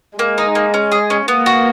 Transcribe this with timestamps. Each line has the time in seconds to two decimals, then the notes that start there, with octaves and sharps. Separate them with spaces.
0.19 G#3 A#3
0.38 D#4
0.55 A#3
0.74 C#4
0.92 G#4
1.10 C#4
1.28 A#3 B3
1.46 F#4